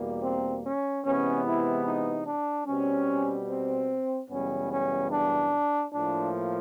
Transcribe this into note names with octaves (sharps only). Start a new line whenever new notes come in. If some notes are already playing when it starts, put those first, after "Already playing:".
Already playing: E2 B2 G3 A#3
C4
C#4
C3 E3 G#3 B3 C#4
E4
D#4
D4
B2 G3 C4 C#4
C4
F#2 C#3 E3 G3 B3 C#4
C#4
D4
A2 F3 A#3 D4